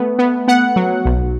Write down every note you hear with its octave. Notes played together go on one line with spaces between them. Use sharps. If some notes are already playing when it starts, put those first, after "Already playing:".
Already playing: A3 B3
B3
B3 F#5
F#3
B1